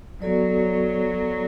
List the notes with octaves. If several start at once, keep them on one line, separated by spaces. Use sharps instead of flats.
F#3 B3 F#4 A4 D5